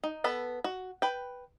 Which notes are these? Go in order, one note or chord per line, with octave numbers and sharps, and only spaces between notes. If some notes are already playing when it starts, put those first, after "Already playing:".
D#4
B3 A4 B4
F#4
B4 G5